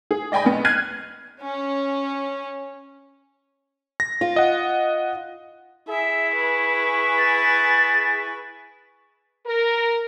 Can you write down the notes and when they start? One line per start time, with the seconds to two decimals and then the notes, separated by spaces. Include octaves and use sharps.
0.11 G#4
0.32 D5 D#5 G5 G#5 B5
0.45 B1 B3
0.65 F6 F#6 G#6 C7 D#7
1.41 C#4
4.00 A#6
4.21 F4
4.36 D#5 F#5
5.89 E4 G#4 E5
6.36 B4 C#6
7.18 A6
9.46 A#4